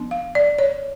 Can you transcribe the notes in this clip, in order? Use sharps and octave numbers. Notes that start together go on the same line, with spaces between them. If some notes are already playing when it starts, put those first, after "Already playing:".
Already playing: F3 B3 D4
F5
D5
C#5